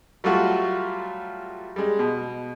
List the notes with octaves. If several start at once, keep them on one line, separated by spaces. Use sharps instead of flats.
F#3 G3 A3 F4 F#4
G3 G#3
B2